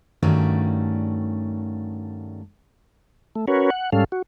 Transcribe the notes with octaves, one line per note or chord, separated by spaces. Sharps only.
G2 D#3 A3 C#4 F#4 D5
A3
C#4 F#4 A#4 B4 C#5
F#5
G#2 G3 C#4 A4 F5
F#4